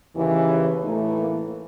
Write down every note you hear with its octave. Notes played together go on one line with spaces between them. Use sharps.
D#2 C#3 E3
A2 E3 A3 D#4
A#3